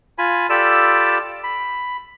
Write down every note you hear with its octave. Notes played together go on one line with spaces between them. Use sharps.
F4 G#5 B5
F4 G4 A4 D5 B5 E6
B5